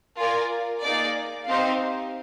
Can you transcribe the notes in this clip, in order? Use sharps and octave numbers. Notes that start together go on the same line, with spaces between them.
F4 A#4 D5 G#5
A#3 D#4 G#4 D5
C4 D#4 G4 C5 F5